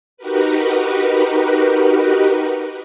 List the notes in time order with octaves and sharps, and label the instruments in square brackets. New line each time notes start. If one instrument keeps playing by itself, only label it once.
[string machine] D#4 F#4 G4 A#4 B4